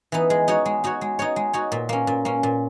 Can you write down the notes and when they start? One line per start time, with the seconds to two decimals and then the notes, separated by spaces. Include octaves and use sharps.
0.12 E3 B3 D#4
0.30 G#3
0.48 D#4 F#4 C#5
0.66 G#3
0.84 D#4 F#4 C#5
1.01 G#3
1.19 D#4 F#4 C#5
1.36 G#3
1.53 D#4 F#4 C#5
1.72 A#2
1.89 A#3 C#4
2.07 A#2
2.25 A#3 C#4
2.43 A#2